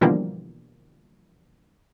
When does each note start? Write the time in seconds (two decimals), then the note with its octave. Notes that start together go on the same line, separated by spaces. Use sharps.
0.01 B2 D3 E3 F3 G3 A#3